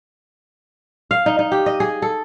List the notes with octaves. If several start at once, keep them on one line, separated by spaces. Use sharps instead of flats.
F5
D#4
D#4
G4
D#5
G#4
A4